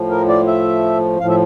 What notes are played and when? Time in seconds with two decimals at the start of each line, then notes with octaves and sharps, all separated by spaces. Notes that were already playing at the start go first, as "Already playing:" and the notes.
Already playing: A2 F3
0.10 A#4
0.29 D5
0.47 E5
1.20 A2 F3 F5
1.29 E5